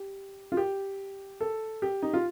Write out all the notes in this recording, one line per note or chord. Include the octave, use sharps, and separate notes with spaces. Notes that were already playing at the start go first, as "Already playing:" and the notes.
Already playing: G4
F4
G4
A4
G4
D#4
F4